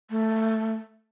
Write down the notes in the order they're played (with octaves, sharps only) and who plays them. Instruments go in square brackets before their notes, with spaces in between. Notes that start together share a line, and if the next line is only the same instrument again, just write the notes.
[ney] A3